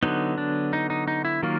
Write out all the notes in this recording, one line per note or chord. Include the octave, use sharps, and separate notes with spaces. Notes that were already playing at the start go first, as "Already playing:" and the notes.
D3 F#3 B3 D#4
D4
D#4
D#4
D#4
E4
D#3 F#3 A#3 F4